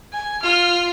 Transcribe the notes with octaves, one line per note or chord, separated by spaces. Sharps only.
G#5
F4 F6